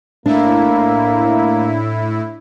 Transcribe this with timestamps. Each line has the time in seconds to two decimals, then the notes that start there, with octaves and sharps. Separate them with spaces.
0.26 A2 A#3 D4 E4